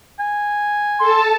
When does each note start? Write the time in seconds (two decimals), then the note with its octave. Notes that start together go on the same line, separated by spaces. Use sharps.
0.19 G#5
0.99 A4 A5 C6